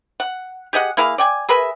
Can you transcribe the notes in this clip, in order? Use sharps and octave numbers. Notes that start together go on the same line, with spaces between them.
F#5
G4 G#4 D#5 F#5
A#3 E4 G#4 F5
D5 G5 G#5
G#4 A#4 B4 E5